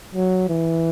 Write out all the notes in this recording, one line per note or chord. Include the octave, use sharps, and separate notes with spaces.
F#3
E3